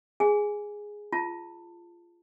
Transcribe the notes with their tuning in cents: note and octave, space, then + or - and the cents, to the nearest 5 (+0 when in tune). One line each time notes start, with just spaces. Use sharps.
G#4 +0 G#5 +0
F4 -20 A5 +25